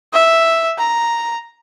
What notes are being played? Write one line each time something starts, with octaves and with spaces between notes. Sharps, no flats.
E5
A#5